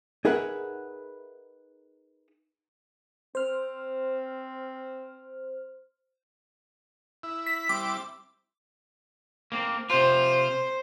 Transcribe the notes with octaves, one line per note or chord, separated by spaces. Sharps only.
D#4 G#4 A#4 B4 E5 F#5
C4 C5 F6
E4
B6
G3 C4 E4 D6
A#3 C4
C3 F4 C5